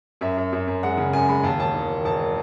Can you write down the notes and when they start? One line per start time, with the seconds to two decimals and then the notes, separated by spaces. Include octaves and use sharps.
0.21 F#2 E5
0.37 F#2
0.53 F#2
0.67 F#2
0.83 G#3 F#5
0.97 C#3
1.13 F#2 G#5
1.28 G#3 B5
1.43 D#2 A5
1.59 E1 A5
1.74 D#3
1.90 D#3
2.05 E1 A5